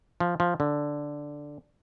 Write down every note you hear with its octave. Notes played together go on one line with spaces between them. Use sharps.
F3
F3
D3